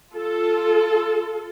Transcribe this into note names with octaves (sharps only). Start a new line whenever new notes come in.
F4 A4